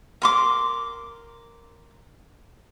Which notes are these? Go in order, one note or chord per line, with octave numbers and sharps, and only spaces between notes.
A#4 C6 D6